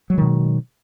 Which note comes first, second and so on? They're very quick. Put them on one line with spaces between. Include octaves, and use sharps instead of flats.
F#3 G#3 D#3 B2